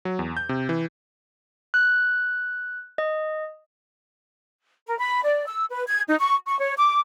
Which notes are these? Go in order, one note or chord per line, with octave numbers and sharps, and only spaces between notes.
F#3
E2
G6
C3
E3
F#6
D#5
A#4
B5
D5
E6
B4
G#6
D#4
C#6
C#6
C#5
D6